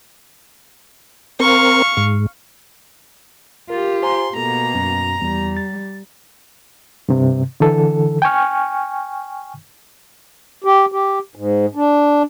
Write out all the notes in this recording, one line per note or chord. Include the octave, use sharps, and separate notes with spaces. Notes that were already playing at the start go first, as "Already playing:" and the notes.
C4 A#4 F5 C#6
G#2
F4 G4 A#4
C5 G#5 A#5 C6
B2 A#3 A4 A#5
F#2
E2 G3
A6
G2 C3
D3 E3 A4
G5 G#5 C#6 F6
G4
G4
G#2
D4